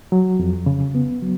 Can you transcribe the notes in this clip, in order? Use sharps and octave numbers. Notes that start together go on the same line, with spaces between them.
F#3
F2
C#3
B3
F#3